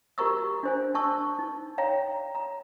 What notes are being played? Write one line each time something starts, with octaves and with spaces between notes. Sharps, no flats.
F#4 G4 A#4 A#5 C#6 E6
D4 C5 G#5
D4 A5 C#6 E6
D#4
C#5 F5 G5 A#5
A#5